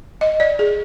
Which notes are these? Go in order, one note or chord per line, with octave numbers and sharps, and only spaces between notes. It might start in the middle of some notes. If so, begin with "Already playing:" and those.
D#5
D5
G#4